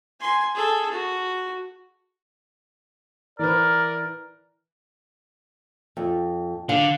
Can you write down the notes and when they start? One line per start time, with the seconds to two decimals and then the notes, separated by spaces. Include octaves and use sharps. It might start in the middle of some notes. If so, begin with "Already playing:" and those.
0.21 G#5 C6
0.55 G#4 A4
0.91 F#4
3.39 E3 A#4 B4 D5
5.97 F2
6.69 D3 F5